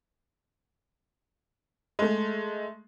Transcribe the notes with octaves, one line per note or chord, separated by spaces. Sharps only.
G#3 A3